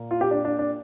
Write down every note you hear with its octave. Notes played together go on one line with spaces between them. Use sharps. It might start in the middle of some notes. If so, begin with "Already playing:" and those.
Already playing: A#2 A#3
F4
G4
D4
D4
D4